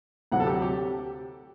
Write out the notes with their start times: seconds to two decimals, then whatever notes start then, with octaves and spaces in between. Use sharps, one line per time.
0.32 D2 C3 F#3 F#5
0.40 A4
0.47 G4
0.62 G4